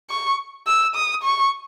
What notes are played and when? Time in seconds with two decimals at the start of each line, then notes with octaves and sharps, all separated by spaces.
0.10 C#6
0.67 E6
0.95 D#6
1.23 C#6